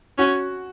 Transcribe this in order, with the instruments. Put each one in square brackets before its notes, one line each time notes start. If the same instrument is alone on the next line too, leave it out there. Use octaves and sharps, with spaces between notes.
[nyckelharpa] C#4 [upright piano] F#4